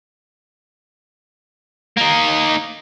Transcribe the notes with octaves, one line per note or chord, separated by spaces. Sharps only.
A#3 D#4